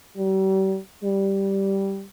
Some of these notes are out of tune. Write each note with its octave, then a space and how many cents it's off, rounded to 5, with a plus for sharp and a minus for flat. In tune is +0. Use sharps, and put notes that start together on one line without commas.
G3 -40
G3 -5